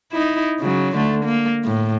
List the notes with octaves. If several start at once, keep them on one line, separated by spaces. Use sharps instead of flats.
D#4 E4
C#3 F#3
D3 A3
A#3
A2